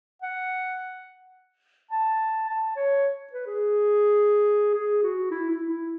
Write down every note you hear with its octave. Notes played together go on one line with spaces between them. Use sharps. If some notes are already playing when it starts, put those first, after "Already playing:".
F#5
A5
A5
C#5
B4
G#4
G#4
F#4
E4
E4
E4